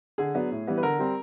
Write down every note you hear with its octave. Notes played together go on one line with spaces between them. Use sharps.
D3 G#4
F#3 B3 D4
A2
E3 G3 B3
B4
D3 A#4
G3 C4